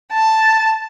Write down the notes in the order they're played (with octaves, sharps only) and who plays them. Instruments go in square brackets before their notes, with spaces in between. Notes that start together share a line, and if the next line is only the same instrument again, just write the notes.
[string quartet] A5